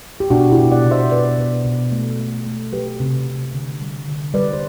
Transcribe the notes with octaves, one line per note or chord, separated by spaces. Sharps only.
G4
B2 D4 F#4
E4 G4
B2
D5 F#5
B2
C5 E5
B2 B4 D5
B2
B2
A3
A3
A3
F#3 G4 B4
C3
C3
D3
G3
D3
G3 B4 D5
C5